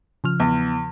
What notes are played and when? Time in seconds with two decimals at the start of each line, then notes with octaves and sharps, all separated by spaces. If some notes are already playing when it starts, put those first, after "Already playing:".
0.24 C#3 F3 F6
0.40 E2